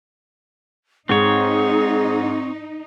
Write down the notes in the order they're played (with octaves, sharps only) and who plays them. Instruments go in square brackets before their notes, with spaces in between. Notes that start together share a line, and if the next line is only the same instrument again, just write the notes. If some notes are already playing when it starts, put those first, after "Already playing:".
[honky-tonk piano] G#2 [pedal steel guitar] C4 C#5 [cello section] D#4 [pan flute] G#4